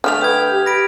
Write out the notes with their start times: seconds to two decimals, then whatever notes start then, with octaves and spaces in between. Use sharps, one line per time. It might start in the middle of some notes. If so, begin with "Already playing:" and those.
0.04 D3 G3 A3 F6 F7
0.21 B4 G5 D#6 G#6
0.50 G4
0.66 B5 A#6 D7